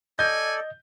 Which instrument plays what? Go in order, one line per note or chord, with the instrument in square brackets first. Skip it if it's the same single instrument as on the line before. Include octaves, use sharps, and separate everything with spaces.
[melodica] A4 D5 [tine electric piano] D#5 [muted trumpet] G#5 [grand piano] G6